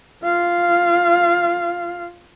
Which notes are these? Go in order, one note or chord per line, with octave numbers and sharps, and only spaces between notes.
F4 F5